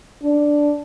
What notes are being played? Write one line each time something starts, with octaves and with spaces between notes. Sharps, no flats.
D4